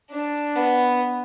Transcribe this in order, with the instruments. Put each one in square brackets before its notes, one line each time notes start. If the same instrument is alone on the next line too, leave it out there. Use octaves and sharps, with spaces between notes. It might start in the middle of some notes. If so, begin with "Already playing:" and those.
[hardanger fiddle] D4
B3